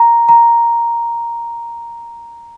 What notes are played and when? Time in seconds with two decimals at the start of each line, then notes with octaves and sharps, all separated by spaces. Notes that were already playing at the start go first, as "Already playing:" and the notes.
Already playing: A#5
0.29 A#5